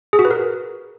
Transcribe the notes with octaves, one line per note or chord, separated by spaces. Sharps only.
G#4
F#4
B4
A#4